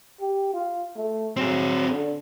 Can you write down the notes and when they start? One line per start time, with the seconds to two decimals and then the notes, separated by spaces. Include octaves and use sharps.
0.20 G4
0.54 F4
0.97 A3
1.37 F#3 C4 G#4
1.90 D3